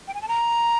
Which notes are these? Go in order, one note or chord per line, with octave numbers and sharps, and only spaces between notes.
G5
G#5
A5
A#5